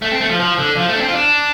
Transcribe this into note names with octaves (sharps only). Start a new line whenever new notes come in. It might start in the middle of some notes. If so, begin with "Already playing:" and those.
A3
C4
A3
F3
F3
D3
F3
A3
D4
C4
F4
D4